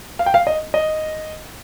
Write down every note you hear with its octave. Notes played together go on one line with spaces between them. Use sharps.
F5
G5
F5
D#5
D#5